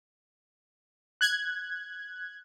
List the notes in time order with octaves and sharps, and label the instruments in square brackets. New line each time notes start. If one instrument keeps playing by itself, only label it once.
[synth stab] F#6 G#6